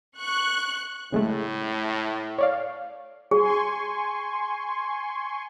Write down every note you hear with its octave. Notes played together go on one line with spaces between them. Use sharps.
C#6 F#6
A2 C#3 G#3 A3
C#5 D5 F5
G#4 G#5 C6 C#6